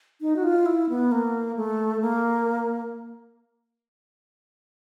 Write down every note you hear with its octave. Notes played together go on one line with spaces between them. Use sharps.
D#4
F#4
F4
E4
B3
A#3
A3
A#3